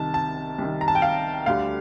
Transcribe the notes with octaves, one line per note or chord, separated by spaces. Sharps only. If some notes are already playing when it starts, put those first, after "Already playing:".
Already playing: C2 C3 D#3 A5
A5
C2 C3 D#3
A#5
A5
G5
F5
D2 D3 G3 F5